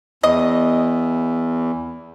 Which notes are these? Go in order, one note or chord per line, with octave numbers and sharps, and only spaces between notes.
E2 D#5